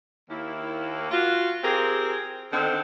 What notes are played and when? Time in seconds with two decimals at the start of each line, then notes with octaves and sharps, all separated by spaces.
0.28 D#2 A#3 E4
1.11 F4 F#4
1.63 C4 G4 G#4 A#4
2.51 D3 D#3 C4 D4